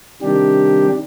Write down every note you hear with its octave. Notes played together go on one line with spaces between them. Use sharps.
C3 D#3 G3 D4 G4